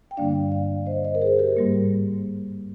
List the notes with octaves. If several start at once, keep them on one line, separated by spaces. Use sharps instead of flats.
G5
G2 D3 G3 A#3 D4 D5 F5
D5 F5
C5 D#5
C5 D#5
A#4
G#4 C5
G4 A#4
G#2 G3 A#3